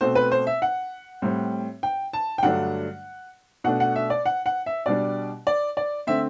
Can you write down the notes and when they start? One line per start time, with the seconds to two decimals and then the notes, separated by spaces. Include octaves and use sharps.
0.01 B2 A3 C4 C5
0.15 B4
0.32 C5
0.47 E5
0.62 F#5
1.22 A2 G3 C4
1.83 G5
2.13 A5
2.38 G5
2.43 G2 D3 F#3 A3 D4 F#5
3.64 B2 A3 D4 F#5
3.80 F#5
3.96 E5
4.10 D5
4.26 F#5
4.46 F#5
4.66 E5
4.86 B2 G3 D4 D5
5.47 D5
5.77 D5
6.07 D3 A3 C4 E5